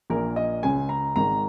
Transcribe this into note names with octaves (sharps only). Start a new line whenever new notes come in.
A#1 A#2 A#4
D#5
C#2 C#3 G#5
A#5
G#1 G#2 D#3 A#5